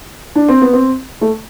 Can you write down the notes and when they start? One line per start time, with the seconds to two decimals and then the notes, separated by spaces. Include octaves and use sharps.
0.35 D4
0.48 C4
0.61 B3
0.73 C4
1.21 A3